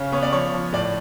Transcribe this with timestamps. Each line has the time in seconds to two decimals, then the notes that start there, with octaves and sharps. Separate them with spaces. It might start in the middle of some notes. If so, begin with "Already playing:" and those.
Already playing: C#3 C#4
0.12 B3 C#5
0.23 D5
0.32 F3 C#5
0.53 F3
0.73 A2 D5